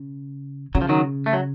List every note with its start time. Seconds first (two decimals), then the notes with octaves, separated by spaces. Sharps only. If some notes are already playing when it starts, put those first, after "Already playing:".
Already playing: C#3
0.75 C#3 F#3
0.81 F3
0.89 D#3 F#3
1.26 A3
1.33 F#3